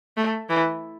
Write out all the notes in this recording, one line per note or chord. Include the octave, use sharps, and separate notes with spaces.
A3
E3